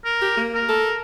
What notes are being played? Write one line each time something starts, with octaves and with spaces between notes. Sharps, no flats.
A#4
G4
A#3
A#4
A4